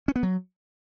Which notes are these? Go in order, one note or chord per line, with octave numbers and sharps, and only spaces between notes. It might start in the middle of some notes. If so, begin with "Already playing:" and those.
C#4
B3
F#3